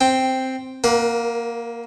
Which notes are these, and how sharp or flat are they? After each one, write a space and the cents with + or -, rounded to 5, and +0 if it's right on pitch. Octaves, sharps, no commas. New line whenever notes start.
C4 +0 G5 +0
A#3 +0 A#4 +35 F#5 +0